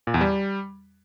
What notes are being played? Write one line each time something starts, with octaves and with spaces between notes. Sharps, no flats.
A#2
E2
G3